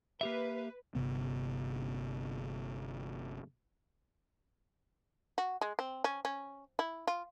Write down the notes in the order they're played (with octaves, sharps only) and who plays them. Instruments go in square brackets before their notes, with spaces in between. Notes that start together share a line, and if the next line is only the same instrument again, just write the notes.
[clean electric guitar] A#3 G4 E5 [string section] B4
[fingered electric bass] G1 F2 C3 B3
[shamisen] F#4
G#3
C4
C#4
C#4
E4
F4